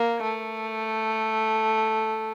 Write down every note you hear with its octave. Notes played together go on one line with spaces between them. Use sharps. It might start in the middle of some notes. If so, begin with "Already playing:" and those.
Already playing: A#3
A3